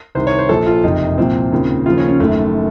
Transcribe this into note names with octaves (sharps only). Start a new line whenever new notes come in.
C2 C3 D#3 C5
C#5
C5
A#1 A#2 F3 A4
F4
F#1 F2 C3 F3 D#4
C2 A#2 F3 C4
D#2 C#3 F3
D#2 C#3 F3 F4
C#4
C#4
F#1 F#2 D#3 A3